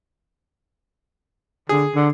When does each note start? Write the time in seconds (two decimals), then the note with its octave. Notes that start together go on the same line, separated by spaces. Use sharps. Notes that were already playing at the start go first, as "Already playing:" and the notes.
1.69 D3 G#4
1.95 D3